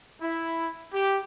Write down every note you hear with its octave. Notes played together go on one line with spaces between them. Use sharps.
E4
G4